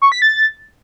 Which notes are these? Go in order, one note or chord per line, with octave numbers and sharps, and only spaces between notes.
C#6
B6
A6